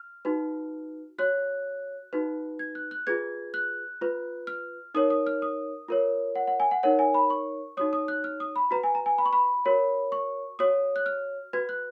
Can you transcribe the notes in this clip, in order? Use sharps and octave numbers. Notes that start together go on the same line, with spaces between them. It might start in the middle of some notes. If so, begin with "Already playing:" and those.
Already playing: F6
D#4 F#4 B4
F#4 C#5 F#6
D#4 F#4 B4
G#6
F#6
F#6
F4 G#4 B4 G#6
F#6
F4 B4
F6
D#4 A#4 C#5 D#6
D#6
F6
D#6
F4 A#4 C#5
F#5
F#5
G#5
F#5
D#4 A#4 C#5 F#5
G#5
B5
C#6
D#4 F#4 C#5 D#6
D#6
F#6
F6
D#6
B5
F#4 B4 A#5
G#5
A#5
G#5
B5
C#6
B5
F#4 A#4 C#5
C#6
F#4 C#5 D#6
F#6
F6
F#4 B4 G#6
F#6